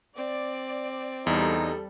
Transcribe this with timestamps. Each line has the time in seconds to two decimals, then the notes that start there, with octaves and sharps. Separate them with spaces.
0.16 C4 D5
1.27 E2 G3 D#4 A4